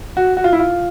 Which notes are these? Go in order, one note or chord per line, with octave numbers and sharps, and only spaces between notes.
F#4
F#4
F4
E4
F4